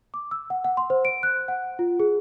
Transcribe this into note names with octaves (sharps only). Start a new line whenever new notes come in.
D6
E6
F#5
F#5
C6
C5
D7
F#6
F#5
F4
G#4